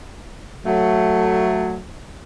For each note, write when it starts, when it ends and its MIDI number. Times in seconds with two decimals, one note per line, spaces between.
0.66 1.80 54
0.66 1.80 57